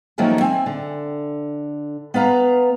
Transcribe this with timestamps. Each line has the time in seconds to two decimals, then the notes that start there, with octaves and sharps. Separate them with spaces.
0.18 D#3 F3 F#3 A3 A#3 C#4
0.41 C4 G#5
0.66 D3
2.14 B3 B4 F5 A#5